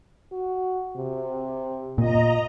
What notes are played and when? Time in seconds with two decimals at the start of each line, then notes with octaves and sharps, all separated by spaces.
0.32 F#4
0.96 C3
1.98 A#2 F4 D#5 A#5